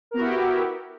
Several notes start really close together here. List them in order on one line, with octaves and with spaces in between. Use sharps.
A#4 B3 F#4 E4 G4